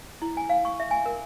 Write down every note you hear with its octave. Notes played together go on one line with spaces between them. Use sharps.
E4
G#5
F5
C#6
E5
G#5
A#4